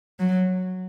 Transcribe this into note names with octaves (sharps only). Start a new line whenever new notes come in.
F#3